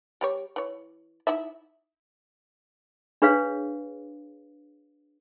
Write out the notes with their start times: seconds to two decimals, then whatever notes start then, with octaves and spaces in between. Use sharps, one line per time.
0.21 G3 G4 C#5
0.56 E3 C#5
1.27 D#4 E4 E5
3.22 D4 G#4 B4 C#5 F5